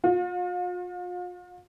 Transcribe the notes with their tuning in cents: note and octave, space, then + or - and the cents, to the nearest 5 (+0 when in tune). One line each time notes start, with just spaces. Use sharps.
F4 +40